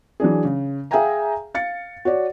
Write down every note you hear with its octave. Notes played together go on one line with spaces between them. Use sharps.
E3 F#3 D4 G#4
C#3
G#4 E5 F5 G5 G#5 A#5
F5 A6 C#7
F#4 C#5 D5